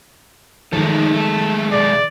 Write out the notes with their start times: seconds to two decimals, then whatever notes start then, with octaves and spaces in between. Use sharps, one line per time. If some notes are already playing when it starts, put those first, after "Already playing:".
0.73 D#3 F3 F#3 G#3 A3 D#4 A4
1.13 A3 A5
1.72 B2 G#4 D5